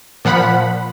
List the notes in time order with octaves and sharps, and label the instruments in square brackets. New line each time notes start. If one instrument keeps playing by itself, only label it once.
[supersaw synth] A#2 F3 F#5 B5